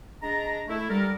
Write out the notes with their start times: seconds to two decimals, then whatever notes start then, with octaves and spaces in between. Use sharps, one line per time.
0.22 G#3 D4 A#5
0.68 A3 E4
0.89 D3 G3 A4 A#4